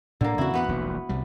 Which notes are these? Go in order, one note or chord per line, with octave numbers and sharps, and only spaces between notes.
A2 D3 A#3
E2 C#3 C4 E4 F#4
E2 B3 B4 F#5
E1 A#1 D#2
C2 G3